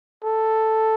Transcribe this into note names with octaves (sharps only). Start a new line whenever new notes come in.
A4